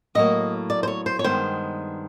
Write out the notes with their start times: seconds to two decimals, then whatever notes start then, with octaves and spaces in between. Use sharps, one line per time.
0.15 A2 F#3 A#3 D#5
0.70 D5
0.83 C5
0.88 C#5
1.06 C5
1.19 C#5
1.24 G2 D#3 G#3 B3 C5